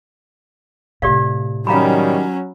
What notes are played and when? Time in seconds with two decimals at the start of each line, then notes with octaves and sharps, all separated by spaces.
1.02 A2 C3 G4 D5 F5
1.67 D#3 F#3 G3 C#4 F5 A#5 B5